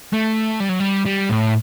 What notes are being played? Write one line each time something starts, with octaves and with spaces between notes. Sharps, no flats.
A3
G3
F#3
G3
G3
A2